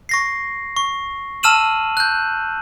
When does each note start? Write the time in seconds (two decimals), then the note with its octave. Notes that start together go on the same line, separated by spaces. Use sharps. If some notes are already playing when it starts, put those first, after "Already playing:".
0.09 C#6 A#6 C7
0.76 C#6
1.43 A5 E6 F6 D#7 E7 F#7
1.97 F#6 G6